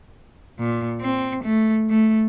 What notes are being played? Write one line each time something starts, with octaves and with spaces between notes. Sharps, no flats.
A#2
C4
A3
A3